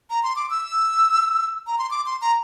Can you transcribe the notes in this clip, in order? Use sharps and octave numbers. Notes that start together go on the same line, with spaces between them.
A#5
C6
D6
E6
A#5
C6
D6
C6
A#5